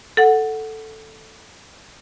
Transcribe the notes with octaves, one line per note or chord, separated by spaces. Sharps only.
A4 F#5